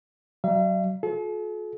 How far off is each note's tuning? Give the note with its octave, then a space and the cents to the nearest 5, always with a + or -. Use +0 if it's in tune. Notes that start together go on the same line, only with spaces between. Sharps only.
F#3 +30 D5 +40 F5 -45
F4 +45 A4 -45